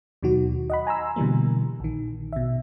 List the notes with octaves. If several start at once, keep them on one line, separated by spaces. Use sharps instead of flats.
D#2 B2 D#3 F#3 F#4
D#5 F#5 B5
G#5 A#5 C6 E6
B2 D3 E3 G3 A#3
A#1 D#3
B2 E5